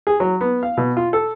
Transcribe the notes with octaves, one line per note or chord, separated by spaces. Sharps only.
G#4
F#3
B3
F5
B2
F4
A4